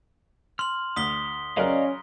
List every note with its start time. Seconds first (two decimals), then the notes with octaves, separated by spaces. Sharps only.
0.59 C6 F6 F#7
0.96 D2 D#6 B6 G7
1.57 C#3 F#3 C#4 A#4 D5 D#5 F5